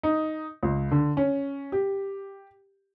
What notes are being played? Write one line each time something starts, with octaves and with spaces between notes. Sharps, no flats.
D#4
C#2
D3
C#4
G4